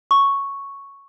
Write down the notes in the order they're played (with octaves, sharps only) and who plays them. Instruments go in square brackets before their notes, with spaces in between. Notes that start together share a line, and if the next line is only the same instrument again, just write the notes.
[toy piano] C#6